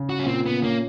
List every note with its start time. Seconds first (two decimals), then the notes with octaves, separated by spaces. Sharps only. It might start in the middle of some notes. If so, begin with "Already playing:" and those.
Already playing: C#3
0.10 F#4
0.19 C#4
0.26 A#2 C4
0.46 B3
0.63 A#3 C#4